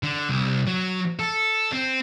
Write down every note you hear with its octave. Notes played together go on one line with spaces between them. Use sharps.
D3
C2
F#3
A4
C4